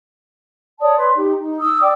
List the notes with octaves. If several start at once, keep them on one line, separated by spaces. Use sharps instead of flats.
C#5 D5 A5 D#6
B4 C6
D#4 G4
D#4
D#6 E6
D5 G5 D6